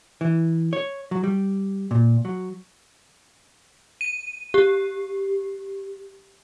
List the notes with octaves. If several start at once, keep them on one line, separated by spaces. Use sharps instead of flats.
E3
C#5
F#3
G3
A#2
F#3
D#7
G4